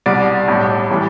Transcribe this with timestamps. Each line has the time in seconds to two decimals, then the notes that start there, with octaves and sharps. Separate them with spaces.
0.06 C2 B2 G3 D5
0.48 B1 A2 G3
0.90 A2 E3 G3